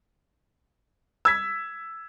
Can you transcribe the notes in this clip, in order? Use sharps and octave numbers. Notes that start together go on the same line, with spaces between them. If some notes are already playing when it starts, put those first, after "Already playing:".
E6 G#6 B6